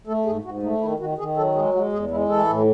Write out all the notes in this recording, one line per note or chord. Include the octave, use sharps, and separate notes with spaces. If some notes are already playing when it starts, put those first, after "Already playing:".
A3 A4
G#2 G#4
G#2 F#4
A3 D#4
D#3 E4
D#3 F#4
D#3 G#4
F#3 A4
G#3 G#4
G#3 F#4
E2 G#4
G#3 E4
E3 A4
A2